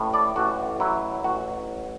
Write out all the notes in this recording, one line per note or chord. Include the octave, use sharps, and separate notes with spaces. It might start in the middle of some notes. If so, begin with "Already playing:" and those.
Already playing: A1 A2
D5
A1 F#4
F#3 E4
A1 F#4